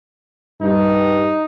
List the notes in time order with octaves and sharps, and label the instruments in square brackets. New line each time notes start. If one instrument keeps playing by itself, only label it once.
[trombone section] G2 [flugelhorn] D#4